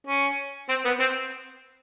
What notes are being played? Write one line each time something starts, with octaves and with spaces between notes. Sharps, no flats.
C#4
C4
B3
C4